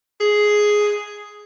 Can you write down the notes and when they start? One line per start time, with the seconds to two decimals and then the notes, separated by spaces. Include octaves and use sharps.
0.20 G#4